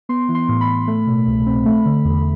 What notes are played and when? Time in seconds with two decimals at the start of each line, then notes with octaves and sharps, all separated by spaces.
0.09 B3 C6
0.29 E3
0.35 C6
0.49 A2
0.61 B5
0.68 A2
0.87 A3
1.07 B2
1.27 C2
1.46 C4
1.66 A3
1.85 D3
2.05 E2